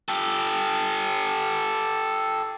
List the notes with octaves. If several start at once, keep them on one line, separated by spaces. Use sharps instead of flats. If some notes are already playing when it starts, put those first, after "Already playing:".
G4 A4